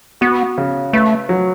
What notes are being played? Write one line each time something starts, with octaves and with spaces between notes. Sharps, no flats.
B3 F#4
C#3
A3 B4
F#3